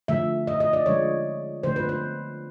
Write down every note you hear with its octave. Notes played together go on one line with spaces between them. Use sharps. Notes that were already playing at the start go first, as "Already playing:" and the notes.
D3 F3 A3 E5
D#5
D#5
D5
D3 F3 G#3 C#5
D3 F3 A3 C5
B4
C5